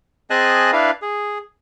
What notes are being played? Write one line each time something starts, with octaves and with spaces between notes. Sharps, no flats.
C4 G#4 D#5 G#5 A5 F#6
D4 E4 B4 F5
G#4